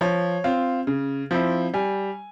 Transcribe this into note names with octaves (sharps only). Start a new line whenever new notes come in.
F3 C#5
C4 F4
C#3
F3 C4 E4
G3 G#5